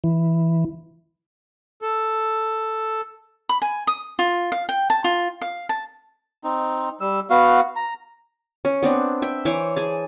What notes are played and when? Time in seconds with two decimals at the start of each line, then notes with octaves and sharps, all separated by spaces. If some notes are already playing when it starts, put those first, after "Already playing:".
0.04 E3
1.82 A4
3.49 B5
3.62 G#5
3.87 D#6
4.19 F4
4.52 F5
4.69 G5
4.90 A5
5.04 F4
5.42 F5
5.69 A5
6.44 C4 D#4
7.00 G3 E6
7.30 B3 F#4 F5
7.76 A#5
8.65 C#4
8.83 B3 C4 D4
9.22 E5 G5
9.45 E3 C5 C#5 D6
9.77 G#4 A5